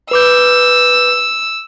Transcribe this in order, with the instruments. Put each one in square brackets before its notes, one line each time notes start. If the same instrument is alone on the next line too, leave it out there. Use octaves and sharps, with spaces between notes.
[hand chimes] B4 D6 G6 [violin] E6